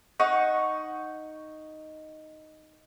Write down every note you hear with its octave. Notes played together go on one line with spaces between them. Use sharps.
D#4 F#5 C#6